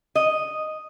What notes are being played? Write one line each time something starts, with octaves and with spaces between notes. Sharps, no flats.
D#5